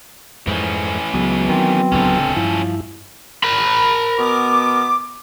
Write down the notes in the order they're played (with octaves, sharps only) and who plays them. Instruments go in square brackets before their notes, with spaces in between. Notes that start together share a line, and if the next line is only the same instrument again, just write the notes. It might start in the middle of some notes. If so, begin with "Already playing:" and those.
[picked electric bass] F2 G#2 [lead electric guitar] E3 C#4
[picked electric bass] C#2 [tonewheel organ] F#3 B3
[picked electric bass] D#3 [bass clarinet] C4
[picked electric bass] D1 C#2 D3 [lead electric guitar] C#4 A4
[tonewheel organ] G2 E4 [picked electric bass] F3
[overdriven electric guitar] A#4 B5
[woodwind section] B2 B3 D6